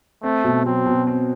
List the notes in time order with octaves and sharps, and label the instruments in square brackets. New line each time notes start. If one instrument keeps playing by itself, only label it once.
[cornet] A3 [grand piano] C4
[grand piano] B2
[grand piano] F#3 [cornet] C4
[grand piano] B2
C4